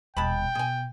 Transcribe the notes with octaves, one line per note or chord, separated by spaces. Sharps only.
D#1 B2 G#3 G5 A5 B5
B2 G#4 G#5